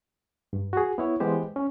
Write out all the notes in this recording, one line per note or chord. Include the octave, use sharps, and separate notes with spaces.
G2
F#4 G#4
B3 E4 C#5
E3 G#3 B3 G4 C5
C#4